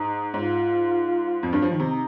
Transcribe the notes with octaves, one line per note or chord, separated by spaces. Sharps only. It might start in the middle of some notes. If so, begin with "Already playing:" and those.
Already playing: G#2 D#4
G#2 F4
F2
G2
F3
D#3
C3 D#4